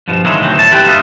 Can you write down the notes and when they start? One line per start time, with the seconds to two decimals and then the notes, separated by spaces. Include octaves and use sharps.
0.08 G2 B2 F3
0.25 D3 D#3 F#3 G#3 A#3 E4
0.41 D2 B2 E3 F#3 C4
0.58 A2 A5
0.71 C2 D3 G4 B4 G5 A5
0.87 G2 A#3 B3 D#4 F4 E5